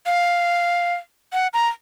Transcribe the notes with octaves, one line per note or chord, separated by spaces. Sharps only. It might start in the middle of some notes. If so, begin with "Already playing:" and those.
F5
F#5
A#5